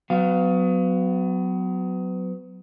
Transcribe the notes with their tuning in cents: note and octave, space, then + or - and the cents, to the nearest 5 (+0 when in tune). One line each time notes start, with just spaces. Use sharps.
F#3 +0 B3 +35 F5 +0